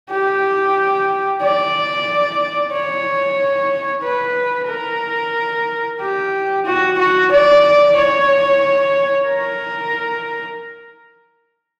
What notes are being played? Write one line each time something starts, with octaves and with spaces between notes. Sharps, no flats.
G4
D5
C#5
B4
A#4
G4
F#4
F#4
D5
C#5
A#4